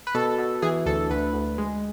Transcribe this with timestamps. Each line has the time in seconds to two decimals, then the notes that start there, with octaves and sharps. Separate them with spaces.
0.07 B4
0.15 B2 A4
0.38 B2
0.62 E3 G#4
0.86 D2 A4
1.10 D2 B4
1.34 D2
1.58 G#3